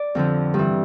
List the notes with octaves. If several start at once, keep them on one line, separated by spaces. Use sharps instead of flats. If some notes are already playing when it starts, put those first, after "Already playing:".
Already playing: D5
F2 D3 F3
G2 E3